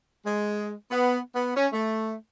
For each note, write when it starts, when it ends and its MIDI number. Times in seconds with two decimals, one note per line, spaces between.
0.25 0.71 56
0.90 1.17 59
1.34 1.51 59
1.55 1.67 61
1.72 2.13 57